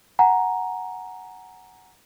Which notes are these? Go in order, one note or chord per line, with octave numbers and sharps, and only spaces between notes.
F#5 G#5 A#5